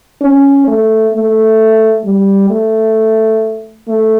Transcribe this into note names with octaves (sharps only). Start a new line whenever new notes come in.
C#4
A3
A3
G3
A3
A3